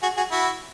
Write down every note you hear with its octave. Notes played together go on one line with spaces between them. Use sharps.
F#4 G#4
F#4 G#4
E4 F#4